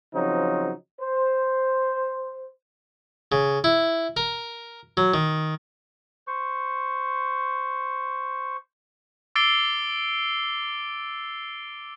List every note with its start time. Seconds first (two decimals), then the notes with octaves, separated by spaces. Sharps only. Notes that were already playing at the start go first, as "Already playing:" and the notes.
0.15 C#3 F3 F#3 C4 D#4
1.01 C5
3.32 C#3
3.64 E4
4.17 A#4
4.97 F#3
5.14 D#3
6.27 C5 C#6
9.36 D6 E6 A6 C7 D7 G7